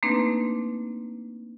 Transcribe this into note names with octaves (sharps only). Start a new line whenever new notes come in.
A3 A#3 C4 D4 D#4 B4